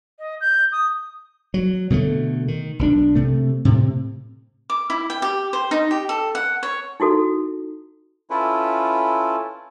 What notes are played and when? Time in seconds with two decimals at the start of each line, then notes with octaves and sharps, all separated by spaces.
0.19 D#5
0.41 G6
0.72 D#6
1.54 F#3
1.90 B2 D3 F3 A3
2.48 D#3
2.79 B1 F3 D4
3.15 C3 A3
3.65 A2 C3
4.70 D6
4.90 E4
5.10 G5
5.22 G4
5.53 C5
5.71 D#4
5.91 G4
6.09 A4
6.35 F#5
6.63 C#5
7.00 D#4 E4 F#4 A4
8.30 C#4 E4 F4 A4 B4